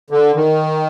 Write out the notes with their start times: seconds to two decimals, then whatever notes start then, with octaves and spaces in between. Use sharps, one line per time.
0.10 D3
0.35 D#3